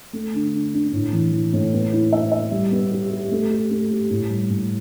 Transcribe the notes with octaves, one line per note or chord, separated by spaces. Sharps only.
A3
D3
D3
D4
A2
E3
E3
A2
B3
E4
E5
E5
G3
B3
G4
G4
A3
G4
A3
G4
A2
G3
A2